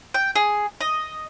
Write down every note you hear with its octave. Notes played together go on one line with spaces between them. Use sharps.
G5
G#4
D#5